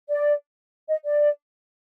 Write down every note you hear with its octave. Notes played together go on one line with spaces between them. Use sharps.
D5
D#5
D5